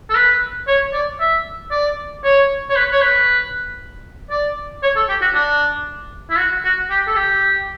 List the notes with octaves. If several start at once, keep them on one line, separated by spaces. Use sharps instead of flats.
A4
B4
C#5
D5
E5
D5
C#5
C#5
B4
C#5
B4
D5
C#5
A4
G4
F#4
D4
E4
F#4
F#4
G4
A4
G4